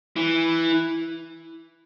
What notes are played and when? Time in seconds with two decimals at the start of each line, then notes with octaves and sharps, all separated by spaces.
0.16 E3